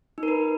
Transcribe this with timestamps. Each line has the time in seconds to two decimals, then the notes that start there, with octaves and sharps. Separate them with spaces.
0.18 D#4
0.23 A#4
0.28 B4